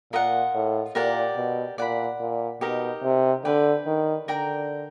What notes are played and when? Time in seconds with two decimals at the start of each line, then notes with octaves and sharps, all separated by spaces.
0.13 A#2 F4 A#4 D#5 F#5
0.54 A2
0.95 A#2 G4 A#4 D5 F#5
1.37 B2
1.78 A#2 D5 F#5 B5
2.20 A#2
2.61 B2 D#4 G4 A#4 D#5
3.04 C3
3.45 D3 B4 D5 G5
3.86 D#3
4.28 D3 A#4 D5 G5 A#5